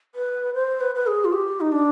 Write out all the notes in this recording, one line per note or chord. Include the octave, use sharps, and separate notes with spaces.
B4
C5
B4
B4
G#4
F4
G4
D#4
D4